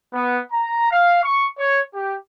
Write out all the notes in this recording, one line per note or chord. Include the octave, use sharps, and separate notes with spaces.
B3
A#5
F5
C#6
C#5
G4